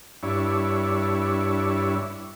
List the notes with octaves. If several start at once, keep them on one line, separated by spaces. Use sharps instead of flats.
G2 D4 E4 C#5